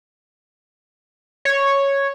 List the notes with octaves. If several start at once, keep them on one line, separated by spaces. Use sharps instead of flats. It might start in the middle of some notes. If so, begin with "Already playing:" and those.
C#5